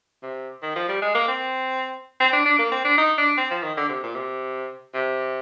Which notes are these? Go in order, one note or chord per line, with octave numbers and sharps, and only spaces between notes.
C3
D#3
F3
G3
G#3
A#3
C4
C4
D4
D4
A#3
C4
D4
D#4
D4
C4
F3
D#3
D3
C3
A#2
C3
C3